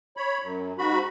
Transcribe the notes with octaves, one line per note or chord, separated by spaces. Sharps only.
C#5 B5
F#2
G#2 F#4 B5